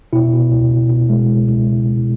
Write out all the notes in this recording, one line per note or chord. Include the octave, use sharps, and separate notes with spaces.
B2 E4
B2
C#2
C#2
B2
G#3
C#2
C#2